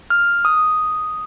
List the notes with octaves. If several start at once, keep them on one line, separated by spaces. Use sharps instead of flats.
F6
D#6